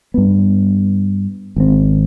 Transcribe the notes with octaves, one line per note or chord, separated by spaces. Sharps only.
G2 B3
G#1 C4